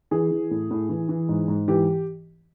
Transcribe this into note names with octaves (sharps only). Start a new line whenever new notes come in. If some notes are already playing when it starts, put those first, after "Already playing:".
E3 G#4
E3
A2
A2
E3
E3
G#2
G#2
E3 G4